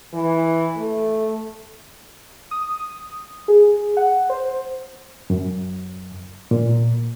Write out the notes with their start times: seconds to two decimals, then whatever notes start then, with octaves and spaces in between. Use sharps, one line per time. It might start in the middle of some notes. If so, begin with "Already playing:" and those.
0.13 E3
0.77 A3
2.51 D#6
3.48 G#4
3.97 F#5
4.30 C5
5.30 F#2
6.51 A#2